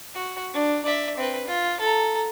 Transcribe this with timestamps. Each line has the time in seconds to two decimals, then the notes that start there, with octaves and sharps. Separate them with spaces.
0.15 F#4
0.53 D4
0.85 D5 E5
1.17 C4 B4
1.47 F4
1.80 A4 A#5